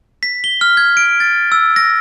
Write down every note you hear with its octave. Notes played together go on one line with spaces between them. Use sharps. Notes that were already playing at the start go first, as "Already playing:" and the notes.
B6
G7
F6
G#6
D7
A6
E6
A#6